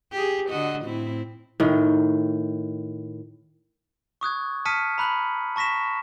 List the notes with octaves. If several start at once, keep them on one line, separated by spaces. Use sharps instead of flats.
G4 G#4
D3 F#4 D#5
A2 C4 E4
A2 D#3
C#6 D#6 F#6 G#6
A5 D#6 F6 B6 C#7 D#7
A#5 B5 F#6 F#7
A5 C#6 A#6 B6 E7